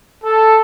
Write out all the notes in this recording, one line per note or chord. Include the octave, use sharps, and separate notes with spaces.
A4